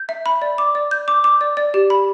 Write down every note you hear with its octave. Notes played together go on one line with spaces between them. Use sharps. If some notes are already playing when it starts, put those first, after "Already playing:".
Already playing: G6
E5
B5
D5
D6
D5
G6
D6
D6
D5
D5
G4
B5